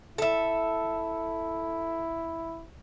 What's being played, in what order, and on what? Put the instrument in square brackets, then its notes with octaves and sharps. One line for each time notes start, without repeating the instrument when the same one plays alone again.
[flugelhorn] E4 [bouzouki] A4 E5